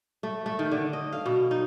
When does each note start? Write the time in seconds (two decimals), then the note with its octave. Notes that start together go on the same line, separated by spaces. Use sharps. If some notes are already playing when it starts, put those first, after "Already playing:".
0.23 A3
0.46 A3
0.59 D#3
0.72 D3
0.93 D#5
1.12 F5
1.26 B2
1.51 D#4